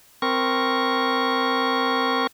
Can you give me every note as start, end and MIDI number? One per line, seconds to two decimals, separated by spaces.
0.22 2.27 60
0.22 2.27 70
0.22 2.27 85